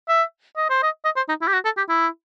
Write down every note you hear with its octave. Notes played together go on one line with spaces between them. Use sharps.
E5
D#5
C5
D#5
D#5
C5
D#4
E4
G4
F#4
A4
G4
E4